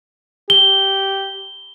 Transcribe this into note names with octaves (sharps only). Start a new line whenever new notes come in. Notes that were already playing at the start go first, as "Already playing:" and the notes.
G4 G7